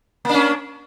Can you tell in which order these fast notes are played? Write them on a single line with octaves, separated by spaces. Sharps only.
A#3 D4 C#4